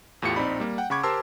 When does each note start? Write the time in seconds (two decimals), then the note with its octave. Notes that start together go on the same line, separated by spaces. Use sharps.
0.22 E2 A2 F4 G4 C#7
0.36 A#1 C4 D#4 D5 B5
0.60 G3 A#3
0.78 F#5 G5
0.90 C#3 F#5 B5 C#6 D6 G#6
1.03 G4 A#4 C5 A5 C6 E6